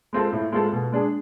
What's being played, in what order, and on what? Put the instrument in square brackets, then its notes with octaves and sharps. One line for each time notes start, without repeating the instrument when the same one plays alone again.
[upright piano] G#3 C4 F4 A4
A2
G#3 C4 F4 A4
B2
G#3 D4 G#4